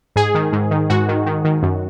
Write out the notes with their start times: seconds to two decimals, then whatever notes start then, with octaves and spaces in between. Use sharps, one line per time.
0.16 G#2 G#4
0.35 D#3
0.53 G#2
0.71 D#3
0.90 G#2 F#4
1.08 D#3
1.26 D#3
1.45 D#3
1.63 F#2